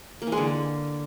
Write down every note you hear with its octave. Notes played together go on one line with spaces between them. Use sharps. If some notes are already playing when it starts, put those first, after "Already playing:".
A#3
E3
G#3
D3